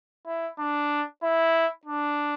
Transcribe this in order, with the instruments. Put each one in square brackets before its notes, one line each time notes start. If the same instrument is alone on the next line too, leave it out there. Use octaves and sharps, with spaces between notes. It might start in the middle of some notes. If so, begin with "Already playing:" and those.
[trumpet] E4
D4
E4
D4